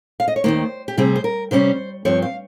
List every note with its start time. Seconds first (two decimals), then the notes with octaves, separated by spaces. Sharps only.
0.20 F5
0.28 D#5
0.36 C#5
0.44 D#2 D#3 A#3 C5
0.88 G4
0.97 C3 G3 C4 G#4
1.16 C5
1.24 A#4
1.51 C3 G3 C#4 C5
2.05 G2 F3 C4 C#5
2.22 F5